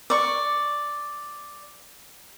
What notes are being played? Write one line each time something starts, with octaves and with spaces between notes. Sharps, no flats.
D5 C#6